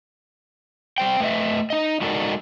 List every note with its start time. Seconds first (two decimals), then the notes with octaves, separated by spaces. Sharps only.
0.98 G3 C5 G5
1.20 A3 B4 D#5 E5
1.70 D#4 D#5
2.02 G#3 D#4 F#4 A4 A#4 D5